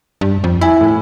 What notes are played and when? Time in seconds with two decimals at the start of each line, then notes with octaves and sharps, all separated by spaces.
0.21 G2
0.44 F2
0.61 E4 E5 G#5
0.81 A2